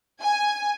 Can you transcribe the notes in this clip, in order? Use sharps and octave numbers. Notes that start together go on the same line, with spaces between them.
G#5